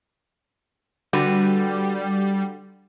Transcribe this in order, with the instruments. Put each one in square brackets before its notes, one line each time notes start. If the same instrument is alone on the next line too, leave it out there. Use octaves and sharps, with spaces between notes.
[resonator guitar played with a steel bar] D3 F#4 B4 [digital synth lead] G3